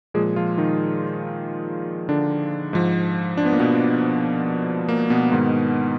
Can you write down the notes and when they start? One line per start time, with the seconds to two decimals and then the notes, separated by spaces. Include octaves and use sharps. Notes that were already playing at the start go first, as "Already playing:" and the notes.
0.14 A#2 F3 G#3 G#4
0.36 F3 F4
0.58 D#3 D#4
2.09 D3 D4
2.73 G#2 F3
3.37 D4
3.45 B3
3.53 A#3
3.60 B2 B3
4.89 A#3
5.10 B2 B3
5.32 G#2 D#3